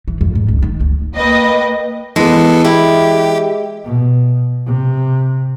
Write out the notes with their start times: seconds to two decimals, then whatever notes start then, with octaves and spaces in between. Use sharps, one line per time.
0.08 E3
0.21 F2
0.35 G#2
0.48 C#2
0.62 D#3
0.80 D2
1.14 A#3 B4 D#5 G5
2.16 E3 G#3 B3 A4
2.64 E4 G4
3.84 B2
4.66 C3